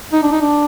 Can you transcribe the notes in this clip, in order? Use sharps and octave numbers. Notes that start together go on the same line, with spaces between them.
D#4
D4
D#4
D4